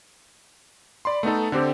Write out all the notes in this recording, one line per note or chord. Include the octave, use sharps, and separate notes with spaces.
D5 B5 C6
A3 B3 D#4 A4
D3 C4 G4 C5